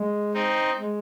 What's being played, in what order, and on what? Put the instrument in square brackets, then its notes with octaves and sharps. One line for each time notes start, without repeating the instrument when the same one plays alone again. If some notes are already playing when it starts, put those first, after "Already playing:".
Already playing: [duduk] G#3
[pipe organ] C4 D#4
[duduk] G#3